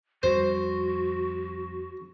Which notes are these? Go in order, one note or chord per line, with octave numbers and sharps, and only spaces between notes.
F2 G3 F#4 C5